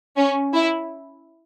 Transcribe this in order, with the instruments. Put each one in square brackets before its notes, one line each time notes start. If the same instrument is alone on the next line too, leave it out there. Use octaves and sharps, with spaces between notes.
[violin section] C#4
E4